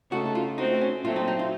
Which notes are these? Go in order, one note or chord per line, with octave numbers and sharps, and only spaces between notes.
C#3 A3 D#4 F#4 A4
F4
A3 C4 D#4 F#4
C#4
A#2 F#3 A3 C4 F4
D#4
D#4
F4